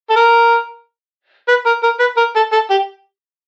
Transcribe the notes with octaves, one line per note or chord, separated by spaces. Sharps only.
A4
A#4
B4
A#4
A#4
B4
A#4
A4
A4
G4